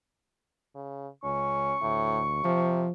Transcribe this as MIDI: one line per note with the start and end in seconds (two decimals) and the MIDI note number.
0.75 1.08 49
1.24 1.73 37
1.24 1.77 61
1.24 2.90 85
1.82 2.43 38
1.82 2.21 45
2.44 2.85 48
2.44 2.92 53